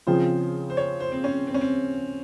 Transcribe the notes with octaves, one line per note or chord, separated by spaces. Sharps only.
C#3 F3 C4 F4 G#4 C5
C5
C#5
C5
C4
C#4
C4
C#4
C4